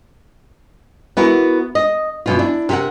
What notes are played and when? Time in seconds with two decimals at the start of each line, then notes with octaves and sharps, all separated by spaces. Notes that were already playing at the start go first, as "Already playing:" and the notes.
1.17 B3 E4 F#4 A#4
1.75 D#5
2.26 F#2 B2 F4
2.39 D4 E4
2.69 C3 G4 G#4 A#4 F#5